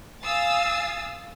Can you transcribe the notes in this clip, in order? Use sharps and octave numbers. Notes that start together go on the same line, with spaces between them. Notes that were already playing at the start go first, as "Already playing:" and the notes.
F5 G#5 D#6 E6 A6 C7